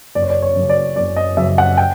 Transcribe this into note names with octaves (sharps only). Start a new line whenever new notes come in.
F#1 D5
C#5
D5
C#5
F#2 C#3
D5
F#1 D5
D#5
F#2 C#3 E5
F#5
G5